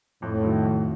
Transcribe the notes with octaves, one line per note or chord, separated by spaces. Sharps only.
F2 A2
D#3 F#3
F2